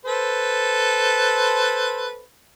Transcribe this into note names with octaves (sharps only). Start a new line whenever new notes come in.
A4 B4 C5